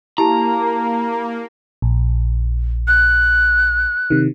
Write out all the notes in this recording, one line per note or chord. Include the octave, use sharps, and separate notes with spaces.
A#3 E4 G4 A5 A#5
A#1
F#6
C3 D#3